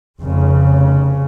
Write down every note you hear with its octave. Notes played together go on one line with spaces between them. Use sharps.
F1 C#3